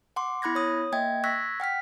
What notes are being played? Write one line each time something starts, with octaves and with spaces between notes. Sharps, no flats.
F#5 C6 D6
B3 E4 B5 F#6 G#6 A#6
C#5 D#6
A#3 D#5 E5 G5 G#6
C#6 E6 F#6 G#6 A#6 B6
F#5 G5 F6 B6